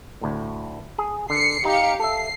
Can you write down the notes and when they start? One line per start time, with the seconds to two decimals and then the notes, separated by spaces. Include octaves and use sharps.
0.21 D2 A2
0.98 G#4
1.30 D3 C7 C#7
1.65 D#4 G4 F5 C#7
2.00 A4 E5 C7